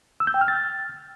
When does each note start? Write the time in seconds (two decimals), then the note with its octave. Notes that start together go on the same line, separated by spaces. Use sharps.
0.20 E6
0.27 G6
0.34 G5
0.41 F6
0.48 A6